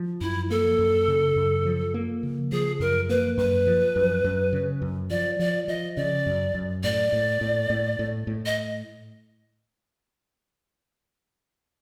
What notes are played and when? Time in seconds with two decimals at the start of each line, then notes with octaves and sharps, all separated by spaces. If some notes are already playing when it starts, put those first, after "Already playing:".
Already playing: F3
0.21 F#2 E4
0.50 A#3 A4
0.79 F#2
1.08 C#3
1.36 F#2
1.65 F3
1.94 A#3
2.23 C#3
2.52 F3 G#4
2.80 F#2 A#4
3.09 A#3 B4
3.38 F#2 B4
3.67 F3
3.96 F#2
4.24 F#2
4.53 C#3
4.82 F#2
5.10 F3 D5
5.39 F3 D5
5.68 F3 D#5
5.96 C#3 D5
6.26 F#2
6.55 F#2
6.84 A2 D5
7.12 A2
7.41 A2
7.70 A2
7.99 A2
8.27 A2
8.46 D#5